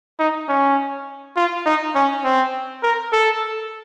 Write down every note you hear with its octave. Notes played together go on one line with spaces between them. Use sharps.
D#4
C#4
F4
D#4
C#4
C4
A#4
A4